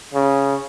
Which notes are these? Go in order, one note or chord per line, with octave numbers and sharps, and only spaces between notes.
C#3